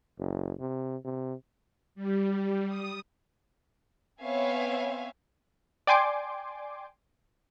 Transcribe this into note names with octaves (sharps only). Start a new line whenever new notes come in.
F#1
C3
C3
G3
D#6
B3 C4 C#5 E5 F5 G#5
D5 G5 G#5 C6 D6